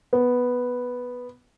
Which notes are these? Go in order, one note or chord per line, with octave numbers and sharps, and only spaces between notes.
B3